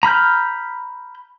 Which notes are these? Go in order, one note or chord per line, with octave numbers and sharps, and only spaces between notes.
A#5 B5 F6 G6